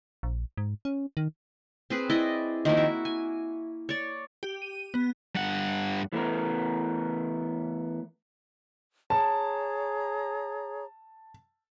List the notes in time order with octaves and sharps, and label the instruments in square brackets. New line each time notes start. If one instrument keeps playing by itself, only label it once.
[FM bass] A#1
G#2
C#4
D#3
[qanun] C4 G#4 B4
E4 D5 D#5
D#3 F3 A#3 E4
F#4 E5
G#5
C#5 D5
[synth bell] G4
D#7
B3
[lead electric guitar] G2 F#5
[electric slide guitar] E3 A3 B3 A#4
[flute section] G#4 C#5 A#5 [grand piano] A5